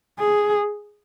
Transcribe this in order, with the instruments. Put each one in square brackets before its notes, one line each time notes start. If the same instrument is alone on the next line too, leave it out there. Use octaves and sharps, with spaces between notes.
[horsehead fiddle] G#4